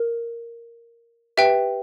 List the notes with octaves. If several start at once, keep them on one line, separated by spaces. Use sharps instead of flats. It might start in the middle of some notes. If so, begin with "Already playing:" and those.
Already playing: A#4
G4 B4 E5 G5